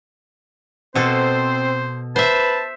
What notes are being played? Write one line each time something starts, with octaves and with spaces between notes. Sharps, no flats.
B2 C4 A4 C5
B4 C5 E5 A5